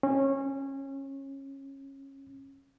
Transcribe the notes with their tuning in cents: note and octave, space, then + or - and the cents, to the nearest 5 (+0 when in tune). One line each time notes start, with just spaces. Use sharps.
C#4 -20